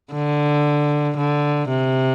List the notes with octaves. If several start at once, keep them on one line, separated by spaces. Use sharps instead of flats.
D3
D3
C3